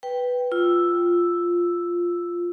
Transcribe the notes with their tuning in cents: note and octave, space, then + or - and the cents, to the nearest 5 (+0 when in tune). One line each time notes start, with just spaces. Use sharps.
B4 +0 G5 +0
F4 +0 E6 +0